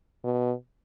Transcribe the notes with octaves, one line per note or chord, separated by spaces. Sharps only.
B2